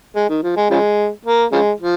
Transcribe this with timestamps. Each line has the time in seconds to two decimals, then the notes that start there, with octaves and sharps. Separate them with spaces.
0.16 G#3
0.29 D#3
0.43 F3
0.56 G#3
0.70 C#3 F3 G#3
1.25 A#3
1.52 C#3 F3 G#3
1.80 F3